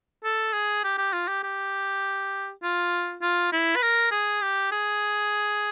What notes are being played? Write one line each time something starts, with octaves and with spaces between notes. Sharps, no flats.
A4
G#4
G4
G4
F4
G4
G4
F4
F4
E4
B4
A#4
G#4
G4
G#4